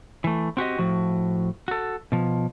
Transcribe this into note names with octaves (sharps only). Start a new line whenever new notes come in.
E3 A3
C4 F#4 G4 D#5
A2 F3 F#4
F#4 A4
B2 F3